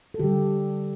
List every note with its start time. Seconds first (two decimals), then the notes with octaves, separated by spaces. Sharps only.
0.14 A4
0.19 D3 G3 G4